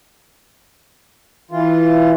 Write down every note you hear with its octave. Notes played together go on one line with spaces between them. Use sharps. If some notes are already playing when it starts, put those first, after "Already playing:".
E3 F4